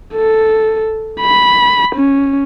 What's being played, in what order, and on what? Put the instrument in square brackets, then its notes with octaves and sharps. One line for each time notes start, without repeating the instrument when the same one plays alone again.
[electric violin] A4
B5
C#4